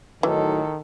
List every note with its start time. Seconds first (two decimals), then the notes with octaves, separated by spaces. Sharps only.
0.23 A2 D#3 E3 F#3 D#4 A4